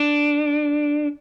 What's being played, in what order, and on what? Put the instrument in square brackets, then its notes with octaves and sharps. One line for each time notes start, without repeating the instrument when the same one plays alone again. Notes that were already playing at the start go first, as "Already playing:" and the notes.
Already playing: [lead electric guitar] D4